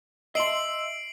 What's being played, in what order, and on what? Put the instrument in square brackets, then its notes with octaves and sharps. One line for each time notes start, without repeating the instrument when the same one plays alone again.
[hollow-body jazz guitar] D#5 A5 C6 [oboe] E5 [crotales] C7 D7 F#7